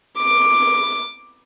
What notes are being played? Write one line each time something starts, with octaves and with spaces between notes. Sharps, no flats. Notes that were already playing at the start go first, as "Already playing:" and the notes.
D6